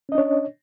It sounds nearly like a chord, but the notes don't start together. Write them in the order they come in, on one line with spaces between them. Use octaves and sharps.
C#4 D#5 D4 C#5